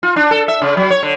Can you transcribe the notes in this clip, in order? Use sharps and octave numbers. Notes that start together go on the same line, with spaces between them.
F4
D4
A4
E5
C#3
F#3
C#5
D3